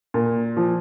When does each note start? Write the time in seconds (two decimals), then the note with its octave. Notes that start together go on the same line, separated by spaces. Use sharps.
0.14 A#2
0.57 F3